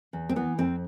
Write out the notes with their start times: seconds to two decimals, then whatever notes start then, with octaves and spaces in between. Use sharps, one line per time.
0.13 E2
0.29 C4
0.36 E3 B3
0.58 F2 C4